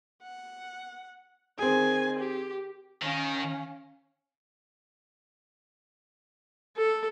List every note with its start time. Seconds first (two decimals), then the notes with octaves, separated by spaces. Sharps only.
0.23 F#5
1.59 D#3 C4 G#4 G#5
2.19 G4
3.02 D#3 C#4 F5
6.77 A4